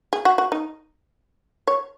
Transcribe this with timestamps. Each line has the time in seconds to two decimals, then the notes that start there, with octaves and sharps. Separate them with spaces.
0.13 G#4
0.25 F#4
0.38 F#4
0.52 D#4
1.67 C#5